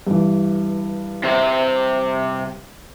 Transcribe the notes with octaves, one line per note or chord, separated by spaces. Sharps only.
G2 E3
C3 C5